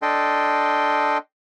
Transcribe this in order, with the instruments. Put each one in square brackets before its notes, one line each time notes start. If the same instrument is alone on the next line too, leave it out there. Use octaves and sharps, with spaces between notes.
[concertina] D4 A4 D#5 G5 C6